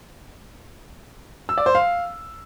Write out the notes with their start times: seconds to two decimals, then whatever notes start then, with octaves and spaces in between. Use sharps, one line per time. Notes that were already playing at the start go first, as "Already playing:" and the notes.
1.49 E6
1.58 D5
1.66 C5
1.75 F5